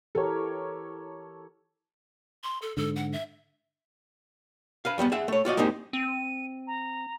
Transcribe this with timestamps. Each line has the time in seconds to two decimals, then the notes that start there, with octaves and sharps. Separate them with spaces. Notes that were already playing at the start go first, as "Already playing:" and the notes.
0.15 E3 G4 A4 A#4 C#5
2.43 C6
2.62 A4
2.77 G#2 D3 A4
2.96 F#5
3.13 E5
4.85 B4 F5
4.98 E2 G3 G#3 B3
5.12 G#4 E5 F#5
5.28 A3 C#5
5.45 F4 F#4 D5 D#5
5.57 G#3 A#3 C4 D#4 G4
5.93 C4 D#7
6.67 A#5